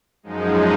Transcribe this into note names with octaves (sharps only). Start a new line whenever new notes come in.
F#2 F3 G#3 D#4